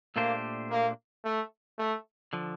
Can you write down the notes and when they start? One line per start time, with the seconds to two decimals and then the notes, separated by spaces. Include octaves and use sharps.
0.16 A#2 A3 A#3 D4 G4 C5
0.71 A#3
1.25 A3
1.79 A3
2.33 D3 F3